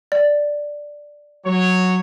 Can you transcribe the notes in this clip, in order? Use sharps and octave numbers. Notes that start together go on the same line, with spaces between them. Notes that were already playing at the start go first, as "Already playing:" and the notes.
D5
F#3 C#5